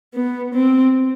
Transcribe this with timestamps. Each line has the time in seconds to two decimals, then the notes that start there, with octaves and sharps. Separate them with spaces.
0.14 B3
0.54 C4